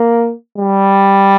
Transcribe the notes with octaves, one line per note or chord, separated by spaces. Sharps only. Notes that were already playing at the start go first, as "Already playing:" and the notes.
Already playing: A#3
G3